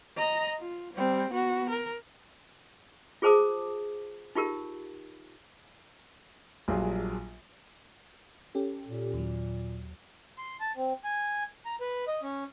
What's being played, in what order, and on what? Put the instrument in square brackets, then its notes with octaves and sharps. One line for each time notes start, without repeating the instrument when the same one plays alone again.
[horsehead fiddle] D#5 A#5
F4
G3 C4
B3 F#4
A#4
[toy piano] F4 G#4 C5 A5 D6 D#6
D#4 F4 G4 A#4
[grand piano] A#1 F#3 G3 F4 G#4
[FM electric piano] C#4 G4 A4
[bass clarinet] A#2
[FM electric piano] D#2 F#3
[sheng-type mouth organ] C6
A5
C4
G#5
A#5
B4
D#5
C#4